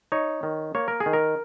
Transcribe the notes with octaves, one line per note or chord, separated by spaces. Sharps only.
D#4 C#5
D#3
A#3 C#5
A#4
G#4
D#3
A#4